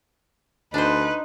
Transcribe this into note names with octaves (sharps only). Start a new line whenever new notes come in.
D2 D4 D#4 B4 C5